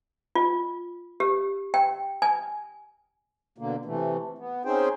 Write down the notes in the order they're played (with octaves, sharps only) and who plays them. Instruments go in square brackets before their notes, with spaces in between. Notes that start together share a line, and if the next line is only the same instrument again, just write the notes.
[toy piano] F4
G4
G5
G#5
[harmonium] B2 D3 A#3
C3 E3 A3
B3
C4 C#4 D#4 G#4 C5 G5